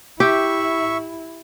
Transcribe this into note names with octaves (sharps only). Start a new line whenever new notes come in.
E4 G4 E5 C#6